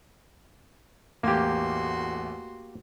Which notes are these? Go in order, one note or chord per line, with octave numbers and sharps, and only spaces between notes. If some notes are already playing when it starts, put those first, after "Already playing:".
A1 E2 A3 A#3 F#4 G4 C6